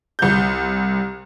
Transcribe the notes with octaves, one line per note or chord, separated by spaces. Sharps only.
C2 G6